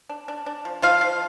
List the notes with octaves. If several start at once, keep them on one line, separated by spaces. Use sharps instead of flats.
D4
D4
D4
F3
F3 F4 F5
F3